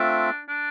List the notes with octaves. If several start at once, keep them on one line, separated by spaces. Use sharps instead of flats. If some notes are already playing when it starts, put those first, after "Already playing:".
Already playing: A3 C4 D4 F4 A4 E5
D4